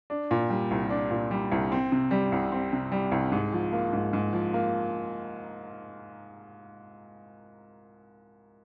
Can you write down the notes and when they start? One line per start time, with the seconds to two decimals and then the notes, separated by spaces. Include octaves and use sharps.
0.10 D4
0.31 A#2
0.50 G3
0.71 C2
0.90 D4
1.11 A#2
1.31 G3
1.52 C2
1.72 C4
1.92 C3
2.11 G3
2.32 C2
2.52 C4
2.72 C3
2.92 G3
3.12 C2
3.32 G#2
3.53 F3
3.72 A#3
3.93 G#2
4.13 G#2
4.33 F3
4.54 A#3